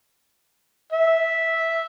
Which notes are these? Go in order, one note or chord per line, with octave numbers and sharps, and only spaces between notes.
E5